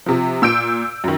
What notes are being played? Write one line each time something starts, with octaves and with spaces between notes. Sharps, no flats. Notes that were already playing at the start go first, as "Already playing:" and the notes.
C3 F3
A#2 E6 G6 D7
F#2 D#3